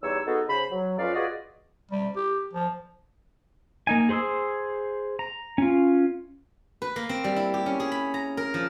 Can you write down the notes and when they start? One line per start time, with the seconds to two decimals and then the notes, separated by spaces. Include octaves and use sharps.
0.03 E2 G3 D#4 C#5 E6
0.27 B3 D#4 F#4 G#4 A4
0.49 C#3 C5 B5
0.70 F#3
0.98 F2 C#4 F4 B4 D5 F5
1.14 F4 F#4 G#4 B4 D5 D#5
1.91 G3
2.16 G4
2.53 F3
3.87 A#3 D#4 G#5
4.09 G#4 C5 C6 D#6 E6
5.19 A#5
5.58 C#4 F4
6.82 B4
6.96 A#3
7.09 C4
7.24 G3
7.36 E4
7.54 G4
7.66 C#4
7.80 G#4
7.92 B5
8.14 A#5
8.37 A#4
8.54 F3